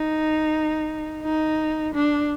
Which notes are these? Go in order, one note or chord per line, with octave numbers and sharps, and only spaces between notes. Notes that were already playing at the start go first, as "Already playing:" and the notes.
Already playing: D#4
D#4
D4